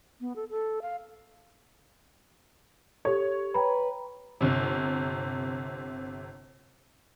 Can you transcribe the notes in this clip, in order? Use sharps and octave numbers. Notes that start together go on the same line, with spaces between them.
B3
A4
A4
F5
G4 A4 C#5
B4 G5 A#5 B5
G1 C3